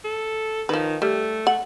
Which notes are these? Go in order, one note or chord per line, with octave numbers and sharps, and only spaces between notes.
A4
D#3 F3 B4
G3 A3
F#5